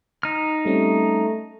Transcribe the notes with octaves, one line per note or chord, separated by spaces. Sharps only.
D#4 F6
G3 A3 C4 C#4